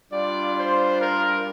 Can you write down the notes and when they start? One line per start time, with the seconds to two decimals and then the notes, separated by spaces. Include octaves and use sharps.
0.12 G3 D4 F4 D5
0.56 C5
1.00 A#4